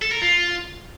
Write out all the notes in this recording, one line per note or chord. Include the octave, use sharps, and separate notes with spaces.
A4
A#4
F4